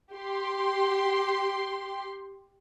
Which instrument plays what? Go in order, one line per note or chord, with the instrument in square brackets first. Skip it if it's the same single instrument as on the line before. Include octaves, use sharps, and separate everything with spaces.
[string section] G4 C6